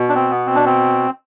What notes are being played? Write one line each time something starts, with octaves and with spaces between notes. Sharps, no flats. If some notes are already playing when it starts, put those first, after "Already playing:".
Already playing: B2
D4
C4
B3
C4
D4
C4